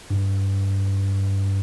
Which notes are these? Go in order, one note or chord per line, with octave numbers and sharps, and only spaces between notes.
G2